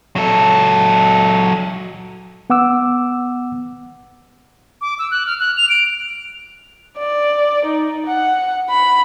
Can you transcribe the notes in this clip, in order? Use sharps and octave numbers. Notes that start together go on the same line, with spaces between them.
F#3 A4
B3 F#5 D6 E6
D6
E6
F#6
F6
F#6
F7
D7
D5
D#4
F#5
B5